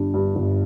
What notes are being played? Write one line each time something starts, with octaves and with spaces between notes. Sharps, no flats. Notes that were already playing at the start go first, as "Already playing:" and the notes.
Already playing: G1 G2 G3 D4
G2
G1